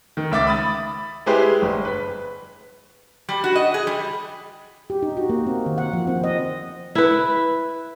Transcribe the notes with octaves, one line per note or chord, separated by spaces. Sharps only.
D#3
C#2 E5 D6 A6
B5 D#6 A6
G#3 E4 G4 G#4 B4 C5
G1
B4 B6
G3
F#4
D#5
G#4
G3
G4
D#4
F#4
A#3
C4
D#3
F#5
F3
C4
D#5
E4 B4